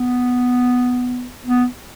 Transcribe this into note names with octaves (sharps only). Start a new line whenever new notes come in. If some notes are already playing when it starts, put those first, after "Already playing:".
Already playing: B3
B3